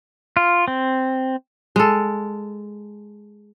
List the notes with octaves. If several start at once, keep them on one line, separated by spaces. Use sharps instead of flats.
F4
C4
G#3 A4